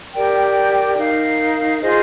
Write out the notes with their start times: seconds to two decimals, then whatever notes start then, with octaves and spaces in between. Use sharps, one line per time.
0.13 G4 A#4 D5 G5
0.97 D#4 A#4 F5
1.81 F4 G#4 C5 D#5